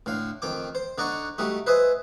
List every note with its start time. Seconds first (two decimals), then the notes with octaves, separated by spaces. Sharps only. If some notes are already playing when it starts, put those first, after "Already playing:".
0.06 A2 D3 F5
0.42 F2 D#3 G5 D6
0.75 C5
0.98 D3 D#4 D5 F#5 A#5 C#6
1.38 G3 A3 D#4 F#4
1.67 B4 C5 D#5 E5 G#5